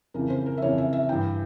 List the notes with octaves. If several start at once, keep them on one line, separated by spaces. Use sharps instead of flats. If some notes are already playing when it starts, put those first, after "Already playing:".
F2 C#3 E3 A#4
C5
A#4
E5
F2 C#3 E3 C#5
E5
E5
G2 E3 G5